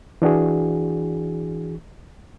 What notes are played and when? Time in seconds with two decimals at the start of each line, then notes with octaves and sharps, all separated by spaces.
0.22 E3 D4 F#4 G#4